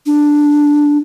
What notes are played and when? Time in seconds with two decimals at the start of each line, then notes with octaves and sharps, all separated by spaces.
0.06 D4